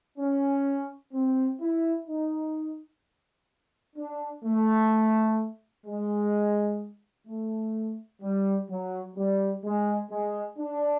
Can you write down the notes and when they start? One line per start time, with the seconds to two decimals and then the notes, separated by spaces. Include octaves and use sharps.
0.19 C#4
1.13 C4
1.60 E4
2.08 D#4
3.96 D4
4.44 A3
5.86 G#3
7.27 A3
8.22 G3
8.69 F#3
9.16 G3
9.64 G#3
10.11 G#3
10.58 D4